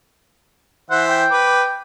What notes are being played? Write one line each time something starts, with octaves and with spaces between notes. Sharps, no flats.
E3 C5 E5 F#5
G5
B4 D6